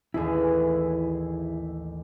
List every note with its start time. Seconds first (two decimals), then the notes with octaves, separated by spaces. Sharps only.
0.14 A1 D#2 E4 G#4